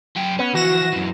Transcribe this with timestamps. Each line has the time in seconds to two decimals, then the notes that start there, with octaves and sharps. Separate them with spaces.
0.17 F#2 G5
0.39 B3 C#4
0.54 E3 F3 F#4 A#6 E7
0.93 F#2 E3